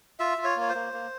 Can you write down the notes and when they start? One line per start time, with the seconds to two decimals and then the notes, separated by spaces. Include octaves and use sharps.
0.19 F4 E5
0.38 F4
0.44 C#5
0.56 A#3
0.61 C#5
0.69 C5
0.75 A#3
0.93 A#3